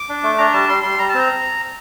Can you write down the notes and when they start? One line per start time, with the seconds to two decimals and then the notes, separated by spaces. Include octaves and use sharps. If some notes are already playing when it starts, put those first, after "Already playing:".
Already playing: D6
0.09 D4
0.23 A3
0.38 D4 A#5
0.53 G3 A5
0.69 G3 C6
0.83 G3 C6
0.99 G3 A#5
1.09 A5
1.14 C4
1.19 A#5